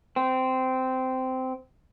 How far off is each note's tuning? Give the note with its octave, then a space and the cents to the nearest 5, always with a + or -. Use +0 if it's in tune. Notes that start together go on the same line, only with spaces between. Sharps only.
C4 -15